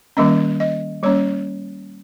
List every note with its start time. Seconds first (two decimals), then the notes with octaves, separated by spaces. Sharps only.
0.17 D#3 G3 A#3 C#4 D#5
0.60 D#5
1.03 G3 A#3 C#4 C#5